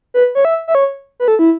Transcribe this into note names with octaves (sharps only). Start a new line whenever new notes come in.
B4
C#5
E5
E5
C#5
B4
A4
E4